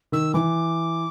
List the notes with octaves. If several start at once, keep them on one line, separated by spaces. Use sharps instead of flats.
D#3 E6
E3 D6